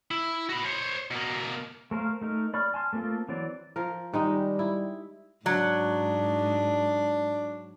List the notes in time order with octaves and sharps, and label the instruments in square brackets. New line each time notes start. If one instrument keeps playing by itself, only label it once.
[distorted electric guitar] E4
F#4 B5
C5 C#5
B2 A#3
[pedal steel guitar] A3 A#4 C5 F5
A3 D#4 A#4
D5 B5 C#6 F6
G#5 A5 C6 F6
A3 A#3 C4 F4 A4
E3 F#3 C4 D5
[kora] F3 A#4
[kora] D#3 G#3 D#4 [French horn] G3
[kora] E4
[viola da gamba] G#2 [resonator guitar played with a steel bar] F#3 [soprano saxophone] D4